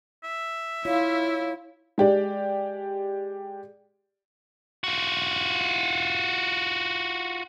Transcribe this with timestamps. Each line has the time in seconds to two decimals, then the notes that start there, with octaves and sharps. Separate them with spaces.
0.24 E5
0.85 E4 F4 C#5
1.98 G#3 G4 D5
4.84 F4 F#4